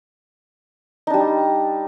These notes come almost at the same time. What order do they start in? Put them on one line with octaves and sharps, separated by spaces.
D#4 D4 G3